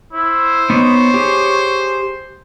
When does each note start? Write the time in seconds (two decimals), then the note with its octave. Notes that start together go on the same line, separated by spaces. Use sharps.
0.13 E4 C5
0.70 B3 D#4 C#5
1.14 G4 G#4